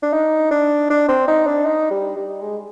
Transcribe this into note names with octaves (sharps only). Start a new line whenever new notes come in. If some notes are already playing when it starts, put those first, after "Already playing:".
D4
D#4
D4
D4
C4
D#4
D4
D#4
G3
G3
G#3